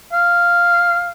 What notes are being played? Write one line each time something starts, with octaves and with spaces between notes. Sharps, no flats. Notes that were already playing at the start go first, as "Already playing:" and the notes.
F5